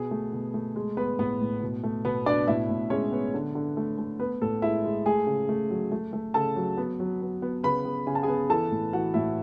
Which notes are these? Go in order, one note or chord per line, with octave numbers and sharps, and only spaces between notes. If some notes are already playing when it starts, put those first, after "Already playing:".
Already playing: B2 B3 G#4
A3
B2
A3
G#3
B3 B4
A2 B3 B4
A2
B2
A3
B2 B3 B4
B2 D4 D5
A2 E4 E5
A2
G#3 C#4 C#5
B3
D3
D3
A3
A3
B3 B4
A2 A4
G#3 E4 E5
G#3
A3 G#4 G#5
C#3
A3
F#3
A3
A3
C#3 A4 A5
F#3
B3
F#3
B3
B3
C#3 B4 B5
B3
C#3 G#5
A5
G#4 G#5
B3
E3 A4 A5
A2
E3 F#4 F#5
A2 E4 E5